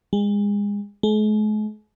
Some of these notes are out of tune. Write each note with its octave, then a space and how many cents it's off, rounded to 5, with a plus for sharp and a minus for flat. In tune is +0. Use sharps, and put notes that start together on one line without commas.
G#3 -30
G#3 +45